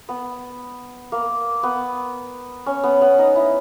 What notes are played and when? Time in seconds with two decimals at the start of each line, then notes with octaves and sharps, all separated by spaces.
0.09 B3
1.12 A#3
1.63 B3
2.66 C#4
2.84 B3
3.02 B3
3.19 D#4
3.36 E4